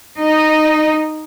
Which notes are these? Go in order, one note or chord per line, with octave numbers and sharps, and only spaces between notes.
D#4 D#5